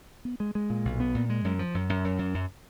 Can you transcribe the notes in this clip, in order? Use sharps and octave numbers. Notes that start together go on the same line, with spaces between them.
B3
G#3
G#3
A#2
B1
B3
A#2
G#3
F#2
F3
F#2
F#2
F#2
F#2
F#2